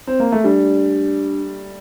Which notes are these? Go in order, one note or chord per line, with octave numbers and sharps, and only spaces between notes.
C4
A#3
A3
G3 D4